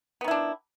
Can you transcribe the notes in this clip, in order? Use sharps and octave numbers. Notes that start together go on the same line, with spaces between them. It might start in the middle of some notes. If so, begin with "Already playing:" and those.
D#3 B3 D4 E4